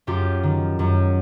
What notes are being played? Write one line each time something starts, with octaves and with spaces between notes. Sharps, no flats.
F#2 F4 G4
D#3
F#2